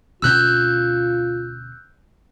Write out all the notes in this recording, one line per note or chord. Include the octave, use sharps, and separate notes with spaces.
D2 B2 C#4 F4 E6 F#6 G6